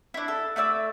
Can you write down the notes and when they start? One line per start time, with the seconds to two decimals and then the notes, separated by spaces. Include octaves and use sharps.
0.14 D4 E4
0.28 A4
0.56 A3 E4 D5 E6